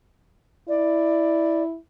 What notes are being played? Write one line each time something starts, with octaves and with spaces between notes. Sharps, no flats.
E4 D5